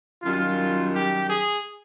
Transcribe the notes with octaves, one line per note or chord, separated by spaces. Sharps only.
F#2 D#3 G3 F4
G4
G#4